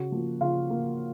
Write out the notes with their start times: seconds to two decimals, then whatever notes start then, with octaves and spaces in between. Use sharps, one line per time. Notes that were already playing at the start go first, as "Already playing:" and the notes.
Already playing: C#3 F#4
0.12 F3 A#3
0.41 C#3 F4 F5
0.70 F3 A#3